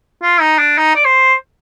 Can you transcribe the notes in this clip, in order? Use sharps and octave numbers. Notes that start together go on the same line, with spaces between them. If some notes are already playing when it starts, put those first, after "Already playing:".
F4
D#4
D4
D#4
D5
C5